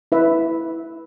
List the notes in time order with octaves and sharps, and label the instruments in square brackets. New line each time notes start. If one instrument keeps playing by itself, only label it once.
[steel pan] E4 B4 E5